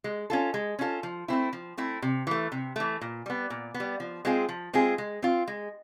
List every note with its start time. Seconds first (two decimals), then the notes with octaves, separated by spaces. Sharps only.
0.04 G#3
0.30 C#4 F4 A4
0.54 G#3
0.79 C#4 F4 A4
1.03 F3
1.28 A3 C4 E4
1.53 F3
1.77 A3 C4 E4
2.02 C3
2.27 E3 A3
2.52 C3
2.76 E3 A3
3.01 A#2
3.26 G3 B3
3.50 A#2
3.74 B3
3.80 G3
4.00 F3
4.25 G#3 C4 F4 G#4
4.49 F3
4.73 G#3 C4 F4 G#4
4.98 G#3
5.22 C4 F4
5.47 G#3